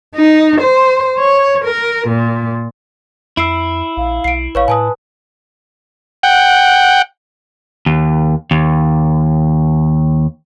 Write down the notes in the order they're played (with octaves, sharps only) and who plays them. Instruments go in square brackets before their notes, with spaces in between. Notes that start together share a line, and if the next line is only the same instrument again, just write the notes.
[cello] D#4
C5
C#5
A#4
A#2
[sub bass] F2 [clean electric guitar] E4 [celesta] E6 C7 D7
[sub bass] A#1 [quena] F5
[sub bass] B1 [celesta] C7 D7
[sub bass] A1 [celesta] B4 C#5 F5 [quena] C#6
[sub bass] A2 [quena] B4 [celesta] G#5 A5 D#6
[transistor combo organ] F#5 G5
[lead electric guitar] D#2
D#2